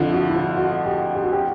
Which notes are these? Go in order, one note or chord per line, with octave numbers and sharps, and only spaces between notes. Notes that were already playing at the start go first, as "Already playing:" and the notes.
Already playing: F2 D3 F3 E4 F4
F#4
E4
F4
F#4
G4
G4
F#4
G4